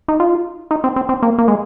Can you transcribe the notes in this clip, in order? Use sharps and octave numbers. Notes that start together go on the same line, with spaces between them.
D#4
F4
D#4
C4
C4
C4
A#3
A#3
G#3